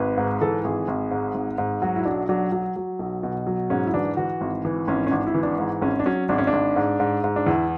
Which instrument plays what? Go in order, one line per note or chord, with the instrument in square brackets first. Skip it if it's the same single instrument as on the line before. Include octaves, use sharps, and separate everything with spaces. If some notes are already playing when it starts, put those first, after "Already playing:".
Already playing: [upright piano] G#1 B4
G#2
E3 A4
G#1 G#4
G#1
G#2
G#1
G#2
F#3 F#4
E4
B1 D4
F#3 D4
F#3
F#3
B1
B2
F#3
G#2 C#4
E4
E3 D4
E3 F#4
G#1
E3
G#1 C#4
C#4
G#1 D4
E4
E3
D4
G#2
G#1 C#4
D4
F#3 C#4
G#1 D4
C#4
D4
G#1
G#2
G#2
G#2
D4
E2 E4